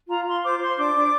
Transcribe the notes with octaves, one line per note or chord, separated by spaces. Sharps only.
F4 A#5
F4 C6
C5 D6
C5 C6
D4 D6
D4